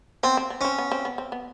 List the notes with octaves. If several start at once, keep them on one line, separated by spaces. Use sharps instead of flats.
B3 C4
C4
B3
C4 C#4
B3
C4
B3
C4
B3